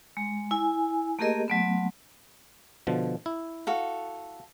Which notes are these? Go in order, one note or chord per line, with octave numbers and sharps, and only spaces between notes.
G#3
E4 G#5
A3 A#3 G4 G#4 A#4 D#5
F#3 A3 B3
B2 D3 F3
E4
F#4 A4 F5